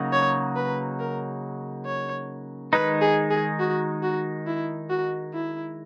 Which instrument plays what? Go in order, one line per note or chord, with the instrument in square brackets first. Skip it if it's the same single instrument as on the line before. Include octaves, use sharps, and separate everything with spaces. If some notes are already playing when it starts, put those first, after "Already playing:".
Already playing: [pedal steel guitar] C#3 F#3 A#3 D#4 F#4
[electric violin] C#5
B4
A#4
C#5
[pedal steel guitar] D#3 G#3 D#4 [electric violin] B4
[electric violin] G#4
G#4
F#4
F#4
E4
F#4
E4